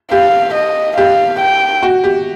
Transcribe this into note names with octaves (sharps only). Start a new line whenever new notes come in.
G4 F5
D#5
G4 F5
G5
F#4
G4